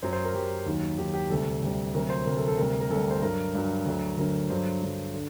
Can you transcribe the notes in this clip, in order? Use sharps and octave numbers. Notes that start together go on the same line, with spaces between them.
F#2 F#3 C5
C5
A#4
F#2 F#3 G4
D#2 D#3 F#3
D#2 D#3 F#3 G4
G4
D2 C3 G3 A4
D2 C3 G3
D2 C3 F#3 A#4
C5
D2 C3 F#3 A#4
A4
A4
D2 C3 G3 A#4
A#4
D2 C3 G3 A4
C5
G2 F#3 A#4
G2 F#3
D2 D3 F#3
D2 D3 F#3 A#4
G2 D3 F#3 C5
G2 D3 F#3
D3